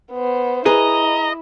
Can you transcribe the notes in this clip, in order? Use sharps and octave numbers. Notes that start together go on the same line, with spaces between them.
B3 C5
E4 G#4 B4 D#5 A#5